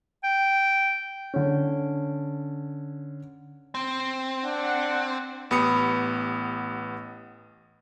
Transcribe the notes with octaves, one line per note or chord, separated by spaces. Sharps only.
G5
D3 C#4
C4
D4 F#5
A1 B3 G4 B5 D#6 C#7